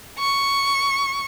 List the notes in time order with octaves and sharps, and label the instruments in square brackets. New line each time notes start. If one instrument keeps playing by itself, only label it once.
[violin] C#6